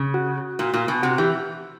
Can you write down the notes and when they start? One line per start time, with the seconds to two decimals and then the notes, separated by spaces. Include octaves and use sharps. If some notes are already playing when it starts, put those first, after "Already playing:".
Already playing: C#3
0.14 F#4
0.59 A#2
0.74 A#2
0.88 B2
1.03 C3 F#4
1.18 E3 G4